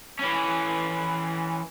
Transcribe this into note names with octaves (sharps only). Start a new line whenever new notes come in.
E3 C#4